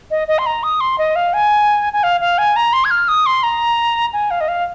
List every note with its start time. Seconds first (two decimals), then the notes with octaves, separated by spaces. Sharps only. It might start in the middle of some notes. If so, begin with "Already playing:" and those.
0.11 D#5
0.28 D#5
0.39 C6
0.46 A#5
0.63 D#6
0.80 C6
0.98 D#5
1.16 F5
1.33 G#5
1.93 G#5
2.03 F5
2.21 F5
2.38 G#5
2.56 A#5
2.73 C6
2.85 G#6
2.91 F6
3.08 D#6
3.26 C6
3.43 A#5
4.13 G#5
4.31 F5
4.41 D#5
4.48 F5